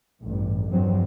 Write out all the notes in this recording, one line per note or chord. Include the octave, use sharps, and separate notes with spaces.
A1 E2 G2
E2 G2 F3 F#3 C4